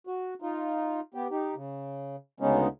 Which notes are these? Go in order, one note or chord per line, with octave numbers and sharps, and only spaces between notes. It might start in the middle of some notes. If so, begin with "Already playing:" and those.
F#4
D#4 F4
B3 G4
D#4 G4
C#3
D2 C#3 G#3 B3 C#4 D#4